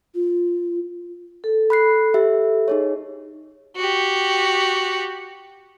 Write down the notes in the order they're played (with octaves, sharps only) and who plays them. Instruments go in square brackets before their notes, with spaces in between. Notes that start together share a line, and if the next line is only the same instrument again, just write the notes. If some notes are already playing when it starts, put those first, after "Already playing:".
[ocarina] F4
[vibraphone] A4
[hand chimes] B5 F#6 C7
G4 E5
D#4 G#4 C#5
[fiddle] F#4 G4